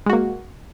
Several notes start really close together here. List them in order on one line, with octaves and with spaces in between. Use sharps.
G#3 F#4 A#3